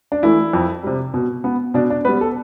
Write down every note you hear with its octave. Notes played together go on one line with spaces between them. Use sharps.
D4
E3 A3 E4
F2
C3 G3
B2
B3
B2 D4
D4
G3 B3 B4
A4